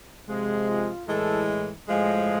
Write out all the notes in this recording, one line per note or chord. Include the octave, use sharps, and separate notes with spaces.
C3 F3 G#3
F4
A2 E3 G#3 A4
A2 F3 G#3